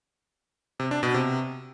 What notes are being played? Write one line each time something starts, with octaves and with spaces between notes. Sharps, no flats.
C3
D4
B2
C3